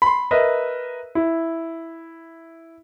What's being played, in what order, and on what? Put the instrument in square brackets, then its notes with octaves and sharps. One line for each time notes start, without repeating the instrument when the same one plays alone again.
[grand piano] B5 C6
A#4 B4 D#5 E5
E4